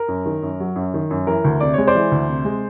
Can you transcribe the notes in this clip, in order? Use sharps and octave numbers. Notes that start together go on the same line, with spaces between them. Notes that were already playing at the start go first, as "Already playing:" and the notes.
Already playing: A#4
F#2
D#3
F#2
F#3
F#2
D#3
F#2
E3 A#4
D2
C3 D5
G#3 C#5
C5 D5
E3
D2
C3
G#3